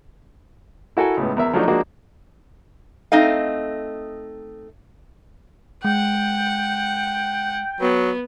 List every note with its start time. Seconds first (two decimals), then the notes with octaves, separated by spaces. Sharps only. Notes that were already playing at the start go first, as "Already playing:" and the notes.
0.97 E4 F#4 A4 A#4 G#5
1.17 C#2 A2 B3
1.37 E2 A#4 E5
1.53 F3 F#3 A3 D4 D#4 F#4
1.68 F3 G#3 A#3 D4 F#4
3.12 A3 C4 D#4 D#5 F5
5.85 G#3 F#5 G5
7.81 F#3 B3